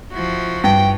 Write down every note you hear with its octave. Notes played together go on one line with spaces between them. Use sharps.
F3 E4 F#4
G2 G5